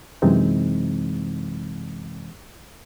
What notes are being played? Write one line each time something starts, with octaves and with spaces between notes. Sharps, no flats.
F#2 C3 E3 G#3 C4 D#4